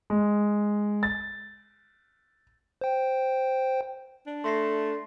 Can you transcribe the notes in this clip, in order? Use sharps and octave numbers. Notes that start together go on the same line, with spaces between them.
G#3
A6
C5 G5
D4
A3 C6 A#6 C7